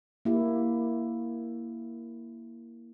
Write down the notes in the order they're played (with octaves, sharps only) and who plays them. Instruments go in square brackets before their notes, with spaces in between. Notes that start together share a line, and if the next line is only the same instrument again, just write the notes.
[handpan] A#3 E4 G4